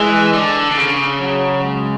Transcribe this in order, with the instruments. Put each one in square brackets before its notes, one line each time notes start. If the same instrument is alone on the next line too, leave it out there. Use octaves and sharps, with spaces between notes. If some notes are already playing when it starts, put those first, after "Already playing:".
Already playing: [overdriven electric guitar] E3 [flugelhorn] G#3
[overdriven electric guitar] D3
D3
C#3
[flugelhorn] F#3
G#3